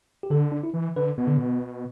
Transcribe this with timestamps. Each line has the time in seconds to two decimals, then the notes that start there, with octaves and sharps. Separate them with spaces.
0.23 G4
0.30 D3 A4
0.52 D4
0.63 E4
0.74 E3
0.96 D3 B4
1.18 B2 B3
1.27 D3
1.37 B2